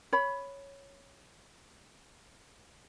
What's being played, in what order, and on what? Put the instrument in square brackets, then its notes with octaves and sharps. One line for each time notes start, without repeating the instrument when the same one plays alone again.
[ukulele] C#5 B5